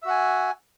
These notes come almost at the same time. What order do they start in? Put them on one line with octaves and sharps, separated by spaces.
E5 F#4 F#5 G#5